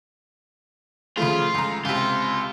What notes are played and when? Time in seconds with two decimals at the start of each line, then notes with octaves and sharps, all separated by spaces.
1.17 C#3 F3 A3 F4
1.54 C#2 A#5
1.85 C#2 C3 F4